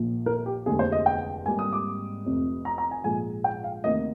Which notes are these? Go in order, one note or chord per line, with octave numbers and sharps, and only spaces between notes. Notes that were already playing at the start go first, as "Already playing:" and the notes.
Already playing: A#1 A#2 F3
A#4
G4
F1 D#2 D3 G#3 G#4
C5
D#5
G5
G#1 G#2 G3 A#3 G#5
D#6
D6
F1 F2 C3
A#5
A#5
G#5
A#1 G#2 F3 G#3 G#5
G5
F5
D2 C3 D#3 A#3 D#5